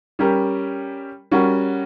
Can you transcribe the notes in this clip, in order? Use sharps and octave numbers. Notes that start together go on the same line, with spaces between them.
G3 C#4 G4 A#4
G3 C#4 F#4 A#4